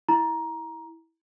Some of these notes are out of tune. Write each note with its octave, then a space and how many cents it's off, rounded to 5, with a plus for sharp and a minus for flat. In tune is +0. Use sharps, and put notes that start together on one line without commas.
E4 -15 A#5 +15